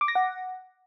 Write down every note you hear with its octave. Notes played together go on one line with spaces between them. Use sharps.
D6
A#6
F#5